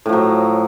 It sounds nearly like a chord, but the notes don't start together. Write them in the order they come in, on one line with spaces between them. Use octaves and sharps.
A2 F3 F#3